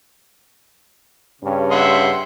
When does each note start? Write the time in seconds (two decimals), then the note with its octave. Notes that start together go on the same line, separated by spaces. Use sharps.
1.42 G2 C#3 C#4
1.71 E5 F#5 C6